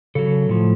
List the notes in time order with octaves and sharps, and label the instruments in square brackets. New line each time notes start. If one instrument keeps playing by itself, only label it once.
[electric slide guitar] C#3 F#3 A4
A2 F3